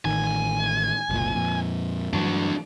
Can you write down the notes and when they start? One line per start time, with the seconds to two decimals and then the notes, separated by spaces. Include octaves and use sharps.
0.05 A1 D#3 G#5
1.09 F#1 C2 A#2
1.35 F2 A#2
2.13 G2 E3 F#3 D4 F#4